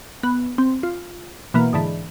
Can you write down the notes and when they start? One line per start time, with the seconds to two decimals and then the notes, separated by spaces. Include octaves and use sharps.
0.23 B3
0.58 C4
0.83 F4
1.54 B2 E3 A#3
1.73 G#2 D3 E3